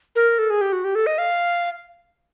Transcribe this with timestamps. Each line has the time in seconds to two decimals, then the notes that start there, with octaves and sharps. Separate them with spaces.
0.16 A#4
0.39 A4
0.50 G#4
0.61 G4
0.73 F#4
0.84 G4
0.95 A4
1.07 D#5
1.18 F5